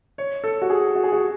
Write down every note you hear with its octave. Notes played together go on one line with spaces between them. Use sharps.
C#5
A4
F#4
G#4
F#4
G#4
F#4